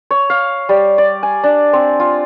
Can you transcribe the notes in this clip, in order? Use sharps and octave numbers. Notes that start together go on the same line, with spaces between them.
C#5
F5
G3
D5
G#5
D4
C4
F4